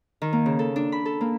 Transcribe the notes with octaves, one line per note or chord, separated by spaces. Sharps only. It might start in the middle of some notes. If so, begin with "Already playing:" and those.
D#3
A#3
C#3
A4
D4
B5
A4
A#3